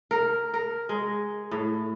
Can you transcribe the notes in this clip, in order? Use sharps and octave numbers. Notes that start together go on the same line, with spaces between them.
A#4
A#4
G#3
A2